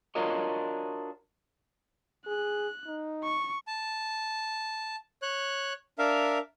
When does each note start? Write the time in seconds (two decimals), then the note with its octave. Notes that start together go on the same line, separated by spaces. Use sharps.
0.15 D4 F4 F#4 A#4 C#5 D#5
2.27 G#4 F#6
2.87 D#4
3.24 C#6
3.67 A5
5.22 C#5 F#6
5.98 D4 A#4 E5 F5